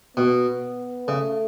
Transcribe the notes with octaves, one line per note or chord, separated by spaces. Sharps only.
B2 B3
C#3 A3